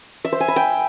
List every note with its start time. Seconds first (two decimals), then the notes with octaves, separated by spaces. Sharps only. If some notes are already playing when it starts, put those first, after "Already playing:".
0.24 E5
0.32 C5
0.40 G#5
0.48 B5
0.56 G5